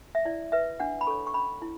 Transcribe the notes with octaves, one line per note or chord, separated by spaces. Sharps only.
E5
E4 D5
B4 E5
D4 F#5
B5
A4 C#5 C#6
C#6
C#4 B5
E4